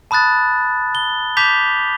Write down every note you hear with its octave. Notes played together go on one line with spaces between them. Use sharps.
A5 B5 D#6 F#6 A6
G7
A5 D6 G6 B6 F7